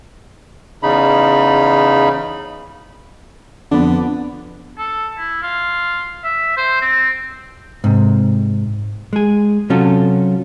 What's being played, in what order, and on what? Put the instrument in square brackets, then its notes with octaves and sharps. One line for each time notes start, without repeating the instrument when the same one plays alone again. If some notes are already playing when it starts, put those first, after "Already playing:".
[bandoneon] E2 C#3 D#4 B5
[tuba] F2 [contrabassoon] D3 [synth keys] B3 D4
[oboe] A4
E4
F4
E5
C5
C4
[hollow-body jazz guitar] G#2 C3
G#3 G#4
C3 F#3 C#4 F4 F#4 A4